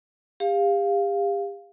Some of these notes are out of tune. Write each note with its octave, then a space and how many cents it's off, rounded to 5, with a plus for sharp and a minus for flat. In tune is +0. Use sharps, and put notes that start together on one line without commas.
G4 +40 F5 +0